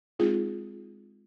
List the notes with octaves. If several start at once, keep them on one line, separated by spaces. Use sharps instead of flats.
G#3 C4 D#4 F4 G#4